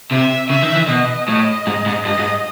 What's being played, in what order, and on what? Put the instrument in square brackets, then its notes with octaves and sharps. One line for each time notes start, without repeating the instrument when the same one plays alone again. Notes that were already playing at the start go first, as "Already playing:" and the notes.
[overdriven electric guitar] C3 [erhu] E5
[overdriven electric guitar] C#3 [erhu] E5
[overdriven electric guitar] D#3
E3
[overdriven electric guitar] B2 [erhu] D#5
[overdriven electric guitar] A2 [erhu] D#5
[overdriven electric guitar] G#2
G#2
[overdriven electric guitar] G2 [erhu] D#5
[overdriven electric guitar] G#2